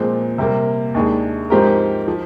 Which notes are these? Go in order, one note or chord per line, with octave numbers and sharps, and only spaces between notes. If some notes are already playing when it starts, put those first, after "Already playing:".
Already playing: A#2 F3 G#3 C4
C3 G3 A#3
D#2 D#3 G#3 D4 G#4
G#2 F3 C4 G4 A#4
F3